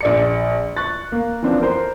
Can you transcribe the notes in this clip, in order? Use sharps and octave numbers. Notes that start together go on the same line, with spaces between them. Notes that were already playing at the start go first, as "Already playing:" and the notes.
A#1 D5 C#7
C#6 F#6 A6
A#3
E3 F3 B3 C4 D4
A#4 C5 C6